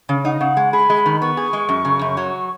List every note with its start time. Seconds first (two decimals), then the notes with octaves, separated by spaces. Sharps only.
0.09 C#3
0.25 D#4 F#5
0.32 D#5
0.40 C#3 F#5
0.57 G#3
0.72 G#4 B5
0.90 G#3
1.06 D#3
1.21 B3 C#6
1.37 G#4
1.53 G#3
1.69 F#2
1.85 C#3
2.01 F#2
2.17 F#3